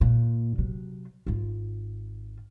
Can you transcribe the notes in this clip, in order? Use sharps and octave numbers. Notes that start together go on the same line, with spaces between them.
A#2
C3 F#3
G#1 F4